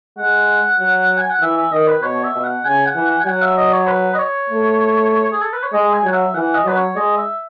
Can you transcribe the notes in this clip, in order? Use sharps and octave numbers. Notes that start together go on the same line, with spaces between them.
G#3 F#5
F#3
G#5
F#5
E3 E5
E5
D#3 D#5
B4
B2 C#5
E5
B2
F#5
C#3 G#5
F#5
E3
F#5
G#5
F#3 F#5
E5
D#5
C#5
B4
D#5
C#5
A3
G#4
A4
B4
C#5
G#3 D#5
G#5
F#3 F#5
E5
E3 F#5
D#5
F#3 B4
C#5
G#3 D#5
E5